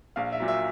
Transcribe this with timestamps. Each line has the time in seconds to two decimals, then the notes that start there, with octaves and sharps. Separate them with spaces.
0.16 A#1 F5
0.32 E5
0.40 A#2 F#3
0.48 E5